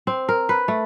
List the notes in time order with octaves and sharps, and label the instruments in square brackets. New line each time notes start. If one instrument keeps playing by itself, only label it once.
[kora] C4
A#4
B4
A3